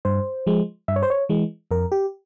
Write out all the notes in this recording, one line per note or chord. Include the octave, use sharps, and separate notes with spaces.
G2 C5
F3 G#3
G2 E5
C#5
C5
C#5
E3 G#3
F2 A#4
G4